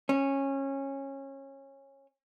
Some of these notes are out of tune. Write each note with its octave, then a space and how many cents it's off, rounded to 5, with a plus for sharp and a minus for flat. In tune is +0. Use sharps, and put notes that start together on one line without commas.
C#4 -20